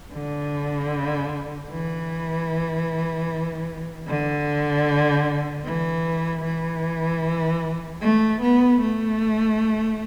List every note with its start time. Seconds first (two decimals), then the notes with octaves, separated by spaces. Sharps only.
0.13 D3
1.70 E3
4.08 D3
5.65 E3
6.45 E3
8.01 A3
8.42 B3
8.81 A3